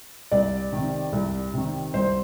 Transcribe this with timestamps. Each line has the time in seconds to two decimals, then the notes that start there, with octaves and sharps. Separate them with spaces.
0.31 C2 D5
0.73 C3 D#3
1.13 C2
1.53 C3 D#3
1.94 C2 C5